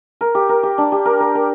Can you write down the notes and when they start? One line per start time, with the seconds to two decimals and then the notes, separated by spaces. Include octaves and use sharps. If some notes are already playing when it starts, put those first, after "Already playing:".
0.21 A#4
0.35 G4
0.49 A#4
0.63 G4
0.78 D4
0.92 G4
1.05 A#4
1.20 A#4
1.35 A#4